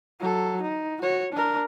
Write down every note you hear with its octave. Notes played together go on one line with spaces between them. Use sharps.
F#3 A4
D#4
F#4 C#5
D4 A#4